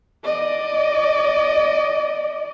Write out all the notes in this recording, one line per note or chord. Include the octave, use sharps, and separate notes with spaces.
D5 D#5